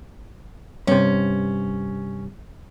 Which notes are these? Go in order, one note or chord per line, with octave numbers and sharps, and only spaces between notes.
G2 C3 C#4